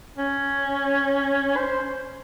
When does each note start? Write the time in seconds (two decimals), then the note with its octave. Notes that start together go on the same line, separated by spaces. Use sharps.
0.18 C#4
1.56 C5